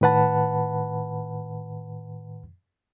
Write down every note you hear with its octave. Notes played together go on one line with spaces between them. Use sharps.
A2 D#3 B4 F#5 A5 B5